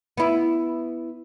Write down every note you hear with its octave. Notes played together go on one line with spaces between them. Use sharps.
B3 E4